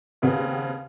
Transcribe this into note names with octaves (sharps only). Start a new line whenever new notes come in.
D#2 C#3 B3 C4